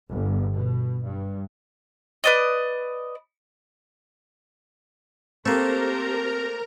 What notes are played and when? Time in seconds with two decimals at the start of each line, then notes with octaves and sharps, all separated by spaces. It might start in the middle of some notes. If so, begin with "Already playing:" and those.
0.11 G1
0.55 B2
1.07 G2
2.24 B4 D5 D#5
5.46 A3 A#3 C4 G4 A4 A#4 C5 A#5